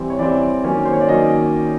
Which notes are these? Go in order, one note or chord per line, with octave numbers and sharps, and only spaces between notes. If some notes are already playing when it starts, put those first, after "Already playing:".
Already playing: E3 G3 C4
C#5
E3 G3 C4 D5
D#3 F#3 A#3 C#4
C5
C#5
D5
D#3 F#3 A#3 C#4 D#5